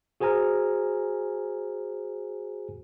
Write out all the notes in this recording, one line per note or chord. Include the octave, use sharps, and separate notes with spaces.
F#4 G#4 C5 G#5 A#5 F6